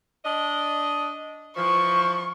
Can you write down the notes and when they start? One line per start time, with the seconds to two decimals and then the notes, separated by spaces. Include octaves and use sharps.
0.25 D4 D#5
1.57 E3 F3 C#6